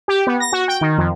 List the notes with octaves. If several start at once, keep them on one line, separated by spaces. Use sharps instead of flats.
G4
B3
A#6
F#4
G5
D#3
F2